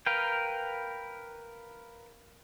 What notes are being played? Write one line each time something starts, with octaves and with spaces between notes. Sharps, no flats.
A#4 B4 F5 G5